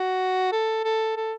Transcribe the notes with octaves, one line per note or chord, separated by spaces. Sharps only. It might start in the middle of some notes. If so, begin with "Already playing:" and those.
Already playing: F#4
A4
A4
A4